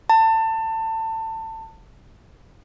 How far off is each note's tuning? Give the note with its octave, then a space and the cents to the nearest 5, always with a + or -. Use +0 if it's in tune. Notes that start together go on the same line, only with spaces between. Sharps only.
A5 +25